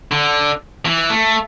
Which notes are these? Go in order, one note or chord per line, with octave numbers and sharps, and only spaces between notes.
D3
E3
A3